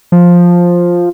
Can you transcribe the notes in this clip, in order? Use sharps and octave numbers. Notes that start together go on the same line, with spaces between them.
F3